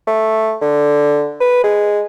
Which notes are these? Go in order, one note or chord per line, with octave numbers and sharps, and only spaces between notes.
A3
D3
B4
G#3